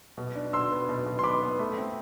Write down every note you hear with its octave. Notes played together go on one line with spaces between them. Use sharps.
B2
D4
B2 C6 E6
B3
B2
B2
C6
B3 B5 D6
B3
A3
C4